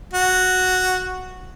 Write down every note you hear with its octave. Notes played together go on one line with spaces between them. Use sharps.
F#4